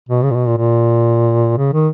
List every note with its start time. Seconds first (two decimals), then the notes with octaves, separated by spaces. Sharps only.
0.09 B2
0.23 C#3
0.30 A#2
0.35 B2
0.46 A#2
0.57 A#2
1.57 C#3
1.73 D#3